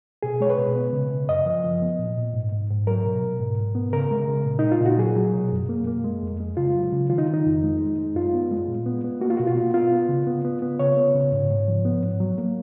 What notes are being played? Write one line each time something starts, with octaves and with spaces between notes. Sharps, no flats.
B2 G#4
G#3 C#5
B4
B2
B3
C#3
C#3
F#2 D#5
F3
F3
B3
A#2
A#2
G#2
G#2
G#2
F#3 A#4
B2
B2
G#2
G#2
B3
C#3 A#4
G#3
C#3
A#2
A#2 D#4
F4
A#2
F#4
F#3 G#4
F#3
B2
F#2
A#3
A#3
G#3
F2
G#3
C#3 F4
F#3
C#3
D#3 F4
D#4
D#3
D#4
F2
G#3
G#3
G#3
F#2 F4
B3
G#3
A#2
B3
B3
A#3 F#4
F4
B2 F#4
F4
A#3
B3 F4
B3
C#3
B3
B3
B3
C#3 C#5
B3
C#3
G#2
G#2
F3
B3
G#2
F#3
A#3